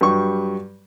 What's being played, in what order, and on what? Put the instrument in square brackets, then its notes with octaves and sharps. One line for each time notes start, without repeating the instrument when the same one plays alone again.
[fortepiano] G2 F#3 G3 C#6